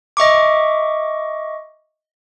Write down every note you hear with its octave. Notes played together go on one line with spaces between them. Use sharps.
D#5 E5 C#6 D6